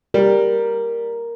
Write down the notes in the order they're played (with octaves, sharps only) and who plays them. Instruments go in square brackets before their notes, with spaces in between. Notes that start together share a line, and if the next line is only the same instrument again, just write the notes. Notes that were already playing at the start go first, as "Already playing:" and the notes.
[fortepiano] G3 [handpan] A#4